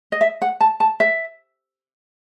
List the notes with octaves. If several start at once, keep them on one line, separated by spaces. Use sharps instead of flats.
D#5
E5
F#5
A5
A5
E5